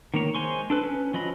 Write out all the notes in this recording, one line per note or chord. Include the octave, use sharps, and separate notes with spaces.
D#3 A#3 C#5
G#3 C5 G#5 C6 C#6
D4 A4 B4
C#4 B4
F3 F#3 D#5 B5